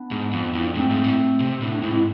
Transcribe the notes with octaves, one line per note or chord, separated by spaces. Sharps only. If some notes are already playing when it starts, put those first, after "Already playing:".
Already playing: B3 D4
G#2
F2
F2 E4
D4
G#2 A3 C4
G#2
A2
C3
A2 B3 D4
C4 E4
G#2
C4 E4